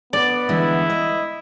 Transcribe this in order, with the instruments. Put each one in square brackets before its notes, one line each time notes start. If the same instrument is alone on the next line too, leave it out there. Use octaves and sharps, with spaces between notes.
[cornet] B3 [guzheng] D5
[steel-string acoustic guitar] D3 E3 G#3 [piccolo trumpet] E4
[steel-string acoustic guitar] D#5